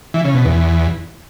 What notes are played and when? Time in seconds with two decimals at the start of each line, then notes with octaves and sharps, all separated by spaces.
0.14 E3
0.24 C#3
0.35 B2
0.45 E2